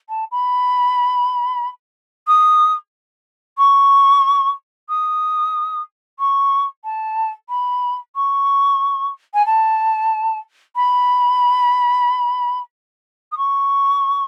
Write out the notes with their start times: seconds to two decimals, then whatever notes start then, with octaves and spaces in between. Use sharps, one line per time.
0.09 A5
0.31 B5
2.27 D#6
3.58 C#6
4.89 D#6
6.19 C#6
6.84 A5
7.49 B5
8.16 C#6
9.34 G#5
9.46 A5
10.76 B5
13.32 D#6
13.37 C#6